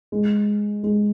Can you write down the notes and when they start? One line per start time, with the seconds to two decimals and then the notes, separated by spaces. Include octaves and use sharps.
0.12 G#3
0.83 G#3